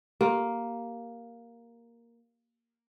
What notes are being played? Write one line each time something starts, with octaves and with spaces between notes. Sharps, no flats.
A#3 G4